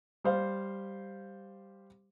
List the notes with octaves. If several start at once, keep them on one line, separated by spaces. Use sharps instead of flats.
G3 C5 F5